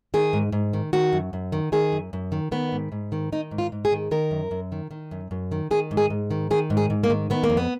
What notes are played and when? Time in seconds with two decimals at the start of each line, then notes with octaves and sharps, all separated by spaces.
0.14 D#3 G#4
0.33 G#2
0.52 G#2
0.73 D#3
0.93 D#3 F#4
1.13 F#2
1.33 F#2
1.52 D#3
1.72 D#3 G#4
1.92 F#2
2.13 F#2
2.32 D#3
2.52 D#3 B3
2.72 G#2
2.92 G#2
3.12 D#3
3.32 D#3 D#4
3.51 G#2
3.58 F4
3.72 G#2
3.85 G#4
3.92 D#3
4.11 D#3 A#4
4.31 F#2
4.51 F#2
4.72 D#3
4.91 D#3
5.11 F#2
5.31 F#2
5.52 D#3
5.71 D#3 G#4
5.91 G#2
5.97 G#4
6.10 G#2
6.31 D#3
6.51 D#3 G#4
6.70 G#2
6.77 G#4
6.90 G#2
7.04 A#3
7.10 D#3
7.30 D#3 B3
7.44 A#3
7.50 F2
7.57 B3